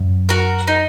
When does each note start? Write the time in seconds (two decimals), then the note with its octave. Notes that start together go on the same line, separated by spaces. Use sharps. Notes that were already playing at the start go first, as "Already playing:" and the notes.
Already playing: F#2
0.29 F#4 A#4
0.68 D#4